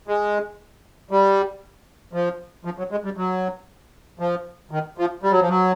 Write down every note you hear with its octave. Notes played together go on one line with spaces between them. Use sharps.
G#3
G3
F3
F3
F#3
G#3
G3
F#3
F3
D#3
F3
G3
F#3
F3
F#3